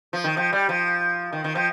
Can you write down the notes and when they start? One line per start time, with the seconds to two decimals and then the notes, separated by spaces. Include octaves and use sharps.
0.13 F3
0.24 D#3
0.37 F3
0.53 G3
0.69 F3
1.33 D#3
1.44 D#3
1.55 F3